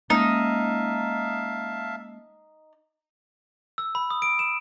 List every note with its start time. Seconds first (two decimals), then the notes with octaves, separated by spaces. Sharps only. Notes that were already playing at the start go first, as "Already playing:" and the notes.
0.10 G#3 A#3 C#4 D#4 E5 F5 A5
3.78 E6
3.95 B5
4.10 D#6
4.22 D7
4.39 E7